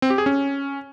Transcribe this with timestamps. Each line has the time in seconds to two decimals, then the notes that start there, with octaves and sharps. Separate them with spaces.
0.02 C4
0.10 G4
0.18 G#4
0.26 C#4